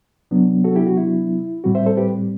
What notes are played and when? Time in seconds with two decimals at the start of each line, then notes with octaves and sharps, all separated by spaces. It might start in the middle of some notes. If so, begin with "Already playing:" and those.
0.31 C3 F#3 B3 D4
0.64 F#4 A4
0.75 E4 G4
0.87 F#4
0.97 E4
1.64 A2 G3 C4 F#4
1.75 C5 E5
1.86 A4 C5
1.97 G4 B4